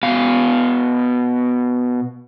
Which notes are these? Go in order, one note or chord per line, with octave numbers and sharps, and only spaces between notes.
B2 F5